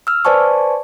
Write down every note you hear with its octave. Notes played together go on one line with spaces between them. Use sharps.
E6 F6
B4 C5 D5 G#5 A5 C#6